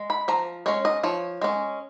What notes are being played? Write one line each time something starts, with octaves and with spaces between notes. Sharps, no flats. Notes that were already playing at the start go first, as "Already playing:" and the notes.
Already playing: G#3
B5
F3 A#5
G#3 C#4 C#5
D#5
F3 C#5
G#3 C#4